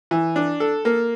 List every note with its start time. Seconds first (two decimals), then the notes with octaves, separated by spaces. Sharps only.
0.11 E3
0.36 D4
0.60 A4
0.85 A#3